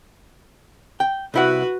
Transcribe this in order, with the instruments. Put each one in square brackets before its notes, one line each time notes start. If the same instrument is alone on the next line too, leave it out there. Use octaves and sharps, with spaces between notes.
[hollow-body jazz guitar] G5
[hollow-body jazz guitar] C2 E4 F#5 [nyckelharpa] F#4 B4